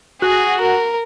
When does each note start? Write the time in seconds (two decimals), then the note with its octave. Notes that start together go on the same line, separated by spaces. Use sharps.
0.22 F#4 G#4
0.61 A#4